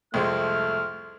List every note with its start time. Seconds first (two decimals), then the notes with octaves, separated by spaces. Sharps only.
0.14 C2 F2 G#3 A3 F6